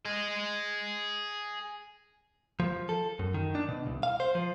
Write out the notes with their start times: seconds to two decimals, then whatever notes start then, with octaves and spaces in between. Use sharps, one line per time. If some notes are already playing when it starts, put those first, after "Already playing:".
0.05 G#4 D#5
2.60 F3
2.89 A4
3.19 F#2
3.34 D#3
3.55 D4
3.69 B2
3.86 C2
4.03 F5
4.20 C5
4.35 F3